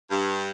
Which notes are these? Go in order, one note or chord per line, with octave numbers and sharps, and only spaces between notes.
G2